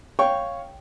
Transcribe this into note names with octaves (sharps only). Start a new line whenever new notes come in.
C#5 F5 G5 C#6